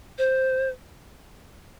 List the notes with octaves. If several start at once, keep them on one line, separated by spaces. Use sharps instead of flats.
C5